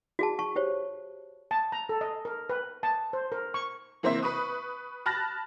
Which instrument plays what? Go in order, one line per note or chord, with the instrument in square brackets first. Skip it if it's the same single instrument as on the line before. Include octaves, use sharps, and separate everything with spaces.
[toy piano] F#4 G#4 A5
A5 C#6
G4 C5 C#5
[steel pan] A5
A#5
A4
D#5
A#4
B4
A5
C5
A#4
C#6
[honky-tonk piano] E3 A#3 C4 C5 E5
B4 B5 C#6 D#6
A5 B5 F6 F#6 A6 A#6